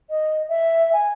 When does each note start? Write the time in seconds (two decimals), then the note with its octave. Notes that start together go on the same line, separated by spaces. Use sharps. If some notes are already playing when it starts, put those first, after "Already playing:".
0.10 D#5
0.49 E5
0.93 G#5